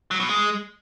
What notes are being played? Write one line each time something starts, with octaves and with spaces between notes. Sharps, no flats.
F#3
B2
G#3